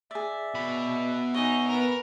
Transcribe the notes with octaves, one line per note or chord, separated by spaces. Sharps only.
G#4 D5 E5
B2 B5
D#4 C#5 D#5 F#5 G#5
B3 A#4